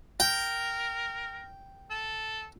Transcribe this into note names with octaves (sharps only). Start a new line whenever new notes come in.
A#4 G5
A4